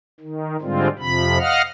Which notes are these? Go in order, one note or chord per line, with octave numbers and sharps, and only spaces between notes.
D#3
G#2 D3 G3 G#3 C4 F4
F2 C3 F3 B5
D#5 F5 F#5 F6